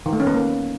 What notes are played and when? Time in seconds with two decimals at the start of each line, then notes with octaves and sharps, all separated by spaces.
0.06 D#3
0.13 A3
0.20 C#4
0.27 B3
0.34 A#3